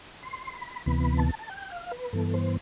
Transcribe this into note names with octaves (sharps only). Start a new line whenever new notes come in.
C6
B5
D2 C3 E3 B3 B5
A5
A5
G5
F5
B4
G2 E3 B3 A4
C5